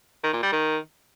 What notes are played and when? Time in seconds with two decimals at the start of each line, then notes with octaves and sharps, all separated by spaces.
0.24 D#3
0.33 A#2
0.43 G3
0.52 D#3